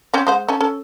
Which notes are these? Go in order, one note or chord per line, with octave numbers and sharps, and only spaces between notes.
C4 C#4
G#3 C5 F#5
C#4 A4 G#5
C#4 A4